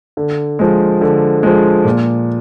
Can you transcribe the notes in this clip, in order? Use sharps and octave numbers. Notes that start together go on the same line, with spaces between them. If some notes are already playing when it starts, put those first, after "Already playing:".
D3
F3 G#3
D3
F3 G#3
A#2